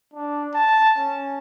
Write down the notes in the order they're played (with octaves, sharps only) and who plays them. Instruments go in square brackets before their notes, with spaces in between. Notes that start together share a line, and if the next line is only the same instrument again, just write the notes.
[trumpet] D4
A5
C#4